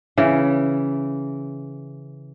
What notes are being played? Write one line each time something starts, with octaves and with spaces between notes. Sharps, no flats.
C#3 E3